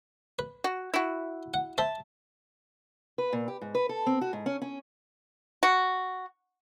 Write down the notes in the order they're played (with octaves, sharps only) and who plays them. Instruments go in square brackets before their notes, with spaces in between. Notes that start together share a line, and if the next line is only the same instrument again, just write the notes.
[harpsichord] B4
[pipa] F#4
E4 F#4
[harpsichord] F#5
[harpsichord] C5 E5 [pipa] A5
[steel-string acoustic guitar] B4
A#2
G4
G#2
B4
A4
C4
F#4
G#2
C#4
C#4
[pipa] F#4